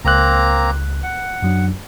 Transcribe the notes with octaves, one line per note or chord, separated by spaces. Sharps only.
C#2 A#3 C4 A#5 F#6
F#5
F#2 F#3 D4